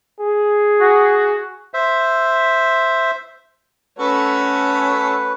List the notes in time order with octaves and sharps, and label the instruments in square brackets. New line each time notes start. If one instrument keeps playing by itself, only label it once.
[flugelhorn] G#4
[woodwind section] F#4
[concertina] C5 E5
[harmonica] A3 F#4 A4 [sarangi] C#4 [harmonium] B4